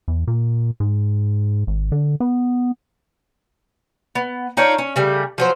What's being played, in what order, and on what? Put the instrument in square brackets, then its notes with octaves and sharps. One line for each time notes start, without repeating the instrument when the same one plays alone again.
[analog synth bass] E2
A#2
G#2
G#1
D3
B3
[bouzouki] B3
D4 D#4 F4 C#5
C#4
C#3 G3 A3
F3 F#3 C5